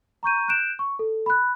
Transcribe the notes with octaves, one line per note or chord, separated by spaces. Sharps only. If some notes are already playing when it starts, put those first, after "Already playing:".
A#5 C#6 G6 D#7
F#6 G6 D7 E7
C#6
A4
B5 F#6